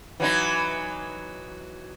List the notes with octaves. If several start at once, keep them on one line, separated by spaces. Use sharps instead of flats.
E3 F#3 D#4